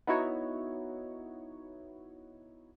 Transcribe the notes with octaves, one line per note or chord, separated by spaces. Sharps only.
B3 D#4 E4 F#4 C#5